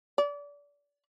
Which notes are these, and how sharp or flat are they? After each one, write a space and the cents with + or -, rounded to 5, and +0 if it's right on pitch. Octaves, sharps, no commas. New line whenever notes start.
D5 -30